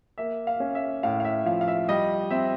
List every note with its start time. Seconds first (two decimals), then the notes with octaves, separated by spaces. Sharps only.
0.18 A#3 E5
0.47 F5
0.60 C#4
0.75 E5
1.03 A2 F5
1.20 F5
1.25 E5
1.46 F3 F5
1.61 F5
1.68 E5
1.89 G3 D#5
2.30 C4 E5